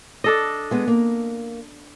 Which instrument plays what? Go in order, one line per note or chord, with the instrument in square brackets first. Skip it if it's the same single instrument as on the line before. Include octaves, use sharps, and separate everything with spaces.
[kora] D4 A4 D#5
[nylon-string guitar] G#3 B3
A#3